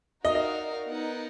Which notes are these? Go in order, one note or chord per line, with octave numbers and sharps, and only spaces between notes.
D#4 F#4 A#4 D5 D#5 F5
D#5
B3 D#4 A#4 D#5 F#5